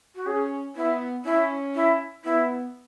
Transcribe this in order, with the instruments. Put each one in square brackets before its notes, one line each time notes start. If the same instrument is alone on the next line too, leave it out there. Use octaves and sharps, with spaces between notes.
[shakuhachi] F#4
[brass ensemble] C#4 [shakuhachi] G#4
[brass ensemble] B3 [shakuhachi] E4
[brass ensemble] C#4 [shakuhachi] E4
[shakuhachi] E4
[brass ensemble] B3 [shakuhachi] E4